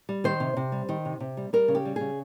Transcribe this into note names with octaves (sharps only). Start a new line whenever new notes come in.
G3
D#3 C5
C3
C3
G3
D#3
C3
C3
G3
G3 A#4
C#3
G4
G3
C#3 G#4